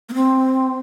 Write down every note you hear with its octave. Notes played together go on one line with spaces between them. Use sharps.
A#3
C4